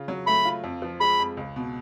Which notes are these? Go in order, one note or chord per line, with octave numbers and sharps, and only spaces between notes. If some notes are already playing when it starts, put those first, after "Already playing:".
Already playing: C#3 F4
F#3
A3 B5
F4
F2
F3
G#3 B5
F2
C#2
B2